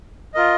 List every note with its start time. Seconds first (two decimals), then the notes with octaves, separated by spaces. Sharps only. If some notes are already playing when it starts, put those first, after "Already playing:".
0.34 F4 A#4 D#5